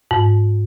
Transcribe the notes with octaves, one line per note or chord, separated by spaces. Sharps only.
G#2